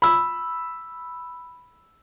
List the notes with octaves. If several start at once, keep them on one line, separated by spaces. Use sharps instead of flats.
B5 E6